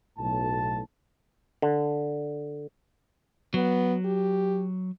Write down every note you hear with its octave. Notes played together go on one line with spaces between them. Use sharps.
B1 A2 A5
D3
F#3 B3
G4